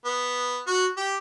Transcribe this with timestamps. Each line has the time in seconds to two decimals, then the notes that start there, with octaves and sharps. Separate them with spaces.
0.05 B3
0.67 F#4
0.97 G4